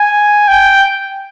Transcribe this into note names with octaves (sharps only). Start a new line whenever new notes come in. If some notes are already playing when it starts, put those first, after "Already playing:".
Already playing: G#5
G5